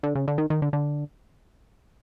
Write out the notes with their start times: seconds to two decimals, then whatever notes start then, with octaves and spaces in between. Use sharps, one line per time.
0.03 D3
0.15 C#3
0.28 D3
0.38 D#3
0.50 D#3
0.62 D3
0.73 D3